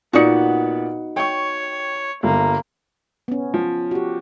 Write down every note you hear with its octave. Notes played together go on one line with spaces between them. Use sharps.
A#2 B3 D#4 F#4 D5 C#7
C#5 G5 C#6
G1 A#3
B3 C#4
F3
F#4 G4